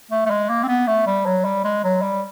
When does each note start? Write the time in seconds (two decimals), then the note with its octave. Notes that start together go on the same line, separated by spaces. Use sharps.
0.11 A3
0.26 A3
0.30 G#3
0.49 A#3
0.63 C4
0.68 B3
0.87 A3
1.06 G3
1.26 F#3
1.44 G3
1.64 G#3
1.84 F#3
2.02 G3